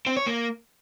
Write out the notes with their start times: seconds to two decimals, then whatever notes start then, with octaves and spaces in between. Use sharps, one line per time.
0.07 C4
0.17 C#5
0.27 A#3